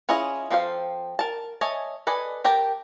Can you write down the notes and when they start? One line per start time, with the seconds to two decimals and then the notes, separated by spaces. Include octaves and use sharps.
0.09 C#4 E4 F4 G#4 D#5
0.51 F3 C4 A4 C5 F5
1.19 A#4 A5
1.61 C#5 D#5 E5 G#5 A5
2.07 A4 B4 D5 D#5 G#5
2.44 G4 A#4 G5 A5